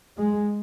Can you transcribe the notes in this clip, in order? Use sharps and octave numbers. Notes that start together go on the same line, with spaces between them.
G#3